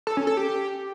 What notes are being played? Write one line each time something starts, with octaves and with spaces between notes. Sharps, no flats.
A4
C#4
A4
G4